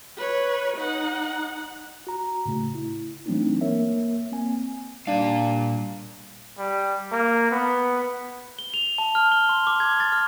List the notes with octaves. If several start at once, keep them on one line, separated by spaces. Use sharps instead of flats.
B4 C#5
D#4 F#5
F#4 A#5
A2 C#3 A3
E4
E3 F#3 A3 C4 D4 D#4
A#3 A#4 C#5 E5
A#3 C4 G#5
A#2 G3 D4 F5
G3
A#3
B3
G7
F7
A5
F6
G7
C6
D6
G#6
A6
F6